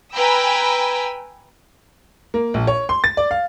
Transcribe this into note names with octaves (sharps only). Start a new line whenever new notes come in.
B4 G5 G#5 A#5 B5 E6
A#3
A#1
C#5
C6
A6
D5
F5